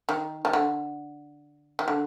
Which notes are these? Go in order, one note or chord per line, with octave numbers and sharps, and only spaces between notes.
D#3
D#3
D3
D#3
D3